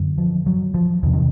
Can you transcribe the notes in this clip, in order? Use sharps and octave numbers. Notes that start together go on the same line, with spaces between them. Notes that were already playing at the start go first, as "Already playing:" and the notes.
Already playing: F#2 D3
F3
F#3
F3
E2 C3 D#3
D#3